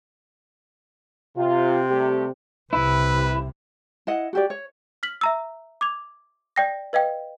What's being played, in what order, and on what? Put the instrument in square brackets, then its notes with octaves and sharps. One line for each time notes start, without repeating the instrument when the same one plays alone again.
[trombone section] C3 [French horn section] F4
[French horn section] G3 A3 G4
[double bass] C2 C3 [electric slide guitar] E4 [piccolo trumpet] B4
[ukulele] E4 D#5 F#5
F#4 G4 D5
C#5
[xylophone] F6 B6 F#7
E5 A#5 E6
D6 G#6 F7
D5 G5 A#6
B4 D#5 F5 G5